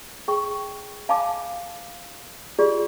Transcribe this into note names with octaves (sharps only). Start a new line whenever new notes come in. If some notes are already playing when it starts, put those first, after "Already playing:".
G#4 G5 C#6
F5 G#5 A5 B5 D6
F4 G4 G#4 D5